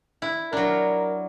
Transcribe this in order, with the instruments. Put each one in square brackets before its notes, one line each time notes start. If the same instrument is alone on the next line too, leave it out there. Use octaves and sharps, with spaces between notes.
[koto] E4
[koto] F#3 D4 [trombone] A#4